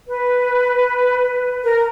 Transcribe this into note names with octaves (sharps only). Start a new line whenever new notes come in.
B4
A#4